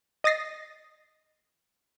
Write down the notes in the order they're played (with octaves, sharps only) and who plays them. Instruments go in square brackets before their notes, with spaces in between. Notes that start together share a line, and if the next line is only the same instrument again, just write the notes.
[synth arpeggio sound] D#5 D#6 A6 A#6 C7